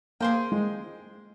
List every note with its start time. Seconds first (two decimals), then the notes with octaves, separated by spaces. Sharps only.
0.20 A#3 G#4 C5 G5
0.52 G#3